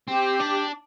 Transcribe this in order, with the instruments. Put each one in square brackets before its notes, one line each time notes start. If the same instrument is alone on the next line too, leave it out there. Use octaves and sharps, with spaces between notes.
[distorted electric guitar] C4 [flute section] G4
[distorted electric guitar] D4